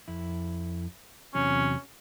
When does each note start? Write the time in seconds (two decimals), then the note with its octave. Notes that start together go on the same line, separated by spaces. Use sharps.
0.08 F2 E4
1.35 E2 C3 F#3 C#4